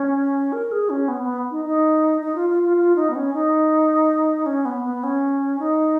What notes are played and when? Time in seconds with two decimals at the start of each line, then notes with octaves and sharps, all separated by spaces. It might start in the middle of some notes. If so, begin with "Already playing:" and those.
Already playing: C#4
0.53 A#4
0.72 G#4
0.90 C#4
1.08 B3
1.23 B3
1.51 D#4
1.65 D#4
2.22 D#4
2.35 F4
2.50 F4
2.63 F4
2.77 F4
2.96 D#4
3.10 B3
3.16 C#4
3.34 D#4
4.46 C#4
4.65 B3
4.84 B3
5.03 C#4
5.59 D#4